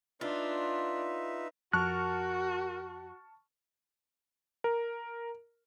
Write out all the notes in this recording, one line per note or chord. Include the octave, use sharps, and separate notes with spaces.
D4 D#4 F4 B4 E5
F2 F#4 A#4 A5 C#6 F6 F#6
A#4